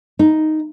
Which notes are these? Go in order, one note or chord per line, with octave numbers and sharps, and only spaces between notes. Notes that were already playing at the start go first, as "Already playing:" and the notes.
D#4